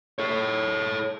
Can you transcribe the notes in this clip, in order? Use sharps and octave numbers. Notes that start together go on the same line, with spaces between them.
A4 C#5